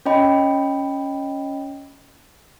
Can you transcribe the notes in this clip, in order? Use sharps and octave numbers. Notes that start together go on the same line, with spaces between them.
C#4 C#5 D#5 G5 B5